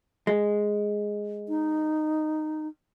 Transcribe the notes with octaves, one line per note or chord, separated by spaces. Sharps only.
G#3
D#4